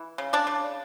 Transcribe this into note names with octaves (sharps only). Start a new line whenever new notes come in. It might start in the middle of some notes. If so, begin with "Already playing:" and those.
Already playing: E3
C#3
D4 D5
C#3